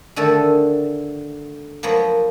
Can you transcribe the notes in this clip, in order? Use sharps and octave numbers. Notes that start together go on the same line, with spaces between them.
D3 D#3 A3 A4
F3 F#3 A#3 B3